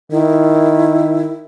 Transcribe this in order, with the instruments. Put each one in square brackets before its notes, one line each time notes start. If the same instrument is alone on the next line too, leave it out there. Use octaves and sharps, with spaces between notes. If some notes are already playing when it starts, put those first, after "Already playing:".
[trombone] D#3 [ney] E4